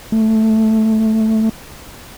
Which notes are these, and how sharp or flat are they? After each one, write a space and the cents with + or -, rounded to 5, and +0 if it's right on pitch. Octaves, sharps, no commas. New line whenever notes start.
A3 +0